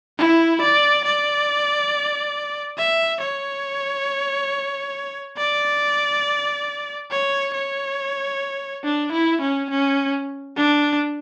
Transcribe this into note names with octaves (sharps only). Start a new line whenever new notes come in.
E4
D5
D5
E5
C#5
D5
C#5
C#5
D4
E4
C#4
C#4
D4